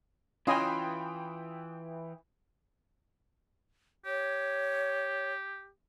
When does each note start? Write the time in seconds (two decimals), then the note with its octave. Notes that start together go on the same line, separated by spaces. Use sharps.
0.47 E3 C#4 F4 D#5 G5 G#5 B5 D#6
4.06 G4 C#5